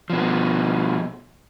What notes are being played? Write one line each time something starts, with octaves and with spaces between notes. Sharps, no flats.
B2 F3